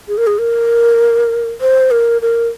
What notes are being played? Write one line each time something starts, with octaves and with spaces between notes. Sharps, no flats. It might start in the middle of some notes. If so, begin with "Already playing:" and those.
G#4
A#4
G#4
A#4
C5
A#4
A#4